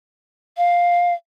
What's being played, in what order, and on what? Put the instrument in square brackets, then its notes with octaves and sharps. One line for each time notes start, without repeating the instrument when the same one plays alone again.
[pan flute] F5